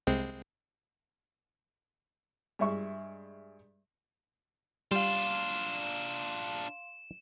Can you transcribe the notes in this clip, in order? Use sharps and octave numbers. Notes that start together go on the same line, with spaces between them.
C2 G#3 C4
G2 G#3 E5 C#6
G3 D4 F4 F5 C6 E7